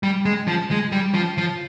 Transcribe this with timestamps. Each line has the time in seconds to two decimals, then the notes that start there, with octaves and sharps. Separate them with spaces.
0.03 G3
0.25 G#3
0.48 F3
0.71 G#3
0.92 G3
1.14 F3
1.38 F3